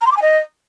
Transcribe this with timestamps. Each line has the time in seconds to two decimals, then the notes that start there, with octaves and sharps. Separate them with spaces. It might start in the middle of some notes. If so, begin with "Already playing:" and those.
0.01 A#5
0.06 C6
0.11 D6
0.16 G#5
0.21 D#5